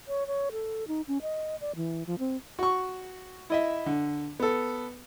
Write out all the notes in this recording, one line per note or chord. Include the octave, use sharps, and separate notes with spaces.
C#5
C#5
A4
D#4
C#4
D#5
D5
E3
F3
C4
F#4 C#6
E4 D#5 E5
D3
B3 A4